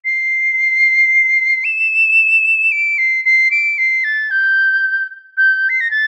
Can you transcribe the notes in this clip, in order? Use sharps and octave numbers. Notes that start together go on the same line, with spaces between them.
C7
E7
D7
C7
C7
D7
C7
A6
G6
G6
C7
A#6
A6